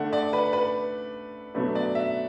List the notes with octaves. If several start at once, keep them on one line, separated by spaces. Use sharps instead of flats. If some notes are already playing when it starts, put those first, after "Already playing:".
Already playing: D3 A3 D4 F#5
D5
B4
B4
B2 F#3 A3 D4 B4
D5
E5